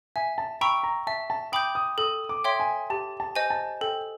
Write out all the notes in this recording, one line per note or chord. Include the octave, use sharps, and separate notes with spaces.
E5 G#5
A5
G5 A#5 B5 C#6 E6
A#5
E5 A5
A5
G5 B5 D6 D#6 G6
D#6
A4 D#6
D6
C#5 E5 G5 C6
G#5
G4 A5
A5
C5 D#5 G#5
A5
A4 G5